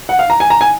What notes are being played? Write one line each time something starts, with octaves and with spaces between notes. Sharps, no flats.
F#5
F5
A#5
G#5
A#5
G#5